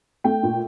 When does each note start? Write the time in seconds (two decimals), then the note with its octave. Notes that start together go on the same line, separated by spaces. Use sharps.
0.24 A3 G5
0.43 A#2